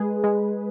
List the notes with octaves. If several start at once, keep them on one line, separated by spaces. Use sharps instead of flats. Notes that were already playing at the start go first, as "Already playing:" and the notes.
Already playing: G#3 G#4 B4
G#3